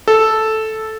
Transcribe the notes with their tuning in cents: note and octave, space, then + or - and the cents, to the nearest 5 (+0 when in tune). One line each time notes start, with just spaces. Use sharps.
A4 -5